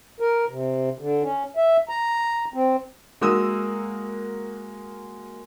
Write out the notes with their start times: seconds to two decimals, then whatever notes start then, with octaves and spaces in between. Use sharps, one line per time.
0.20 A#4
0.48 C3
0.99 D3
1.23 C#4
1.57 E5
1.89 A#5
2.54 C4
3.21 G#3 A#3 F#4 D#6 E6